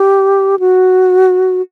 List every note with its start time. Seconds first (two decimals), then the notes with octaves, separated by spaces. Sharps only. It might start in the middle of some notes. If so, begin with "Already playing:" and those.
Already playing: G4
0.59 F#4